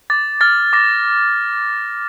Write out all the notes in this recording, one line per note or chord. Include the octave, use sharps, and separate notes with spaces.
D6 A6
F6 A6
D6 A#6